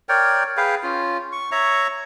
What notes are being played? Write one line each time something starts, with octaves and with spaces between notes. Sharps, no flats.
A#4 C#5 D5 G5
G#4 B4 F5 G5
C#4 F4
C#6
C#5 E5 A#5 C#6